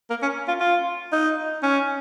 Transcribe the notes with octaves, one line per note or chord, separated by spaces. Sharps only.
A#3
C#4
F4
F4
D#4
C#4